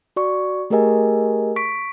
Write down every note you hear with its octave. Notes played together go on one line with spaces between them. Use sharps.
F#4 D5 C#6
A3 G4 G#4 A#4 D#5 G#5
C#6 B6 D7